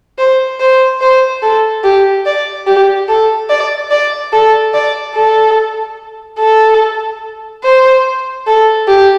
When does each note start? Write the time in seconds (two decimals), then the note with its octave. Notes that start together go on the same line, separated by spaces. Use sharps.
0.18 C5
0.60 C5
1.01 C5
1.43 A4
1.84 G4
2.26 D5
2.67 G4
3.08 A4
3.50 D5
3.91 D5
4.33 A4
4.74 D5
5.15 A4
6.39 A4
7.64 C5
8.47 A4
8.88 G4